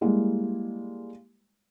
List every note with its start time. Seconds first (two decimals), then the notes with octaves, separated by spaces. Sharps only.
0.01 G3 G#3 A#3 E4